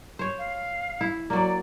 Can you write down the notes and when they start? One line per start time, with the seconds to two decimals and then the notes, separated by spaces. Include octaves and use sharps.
0.19 C5 C#5
0.38 F5
1.01 E4
1.30 F#3 A#3 D5